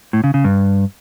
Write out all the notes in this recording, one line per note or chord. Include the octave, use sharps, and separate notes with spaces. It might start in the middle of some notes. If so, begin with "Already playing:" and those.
A2
C#3
C#3
G2